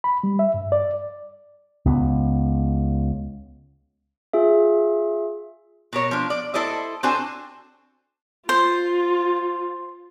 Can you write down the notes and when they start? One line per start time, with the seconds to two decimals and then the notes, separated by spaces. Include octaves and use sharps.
0.04 B5
0.23 G3
0.39 E5
0.54 G2
0.72 D5
1.85 C#2 B3
4.34 F4 G#4 E5
5.93 B2 A#4 C#5
6.11 F3 D4
6.30 D5
6.54 E4 A4 C5 D5 D#5
7.03 C4 D4 F#4 A4 C5 G#5
8.49 F4 C5